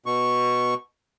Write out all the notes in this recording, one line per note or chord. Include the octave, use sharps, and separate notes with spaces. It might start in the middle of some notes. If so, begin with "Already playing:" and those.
B2 C#6